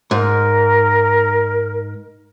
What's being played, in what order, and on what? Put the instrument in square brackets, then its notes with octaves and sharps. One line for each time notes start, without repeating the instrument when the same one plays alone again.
[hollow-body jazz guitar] G#2 [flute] A#4